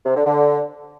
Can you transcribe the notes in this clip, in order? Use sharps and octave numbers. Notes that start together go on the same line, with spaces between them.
C3
D3
D3